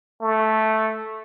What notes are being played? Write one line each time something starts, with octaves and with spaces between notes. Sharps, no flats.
A3